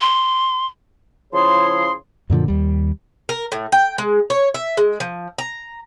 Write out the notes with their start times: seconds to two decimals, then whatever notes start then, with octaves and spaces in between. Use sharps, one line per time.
0.01 C6
1.33 C#3 F3 E4 G#4 C#5 C6
2.30 F#2 A#2 D3 F3
2.48 D#2 G3
3.29 A#4
3.52 A2
3.72 G5
3.98 G#3
4.30 C#5
4.54 E5
4.77 G#3
5.00 F3
5.38 A#5